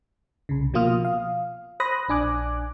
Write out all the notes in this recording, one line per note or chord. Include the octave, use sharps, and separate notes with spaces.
C2 C#3
B2 F3 A#3 F4 D#6 F6
F5
C5 B5 D#6 F#6 A#6
A#1 D4 G#5 D6 F#6